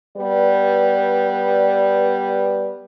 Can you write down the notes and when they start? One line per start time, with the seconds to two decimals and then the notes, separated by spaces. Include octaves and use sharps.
0.17 G3 B3 B4 D5